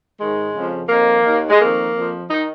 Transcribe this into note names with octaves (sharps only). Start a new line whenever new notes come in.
G#2 D#3 G#3
F2 C#3 F3
F2 D#3 A#3
D#2 D#3
G#3
F2 D#3 A#3
F2 F3
D#3 D#4